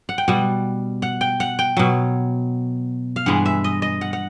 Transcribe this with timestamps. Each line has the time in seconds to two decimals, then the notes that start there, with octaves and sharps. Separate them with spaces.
0.09 F#5
0.18 G5
0.28 B2 G3 F#5
1.02 F#5
1.21 G5
1.40 F#5
1.59 G5
1.77 B2 F#3
3.16 F5
3.26 G2 E3 G#3 F#5
3.46 E5
3.64 D#5
3.82 D#5
4.01 F#5
4.13 F#5